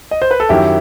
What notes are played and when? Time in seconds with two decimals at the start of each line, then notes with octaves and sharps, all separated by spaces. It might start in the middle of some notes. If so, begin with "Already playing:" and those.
0.11 D#5
0.22 C5
0.31 B4
0.40 A4
0.49 F#2 D#3 F#3 E4 G4